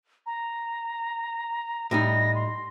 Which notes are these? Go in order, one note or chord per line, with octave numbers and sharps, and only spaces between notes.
A#5
A2 G3 D#4 A#6
C6